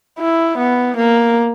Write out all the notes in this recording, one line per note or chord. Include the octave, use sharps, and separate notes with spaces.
E4
B3
A#3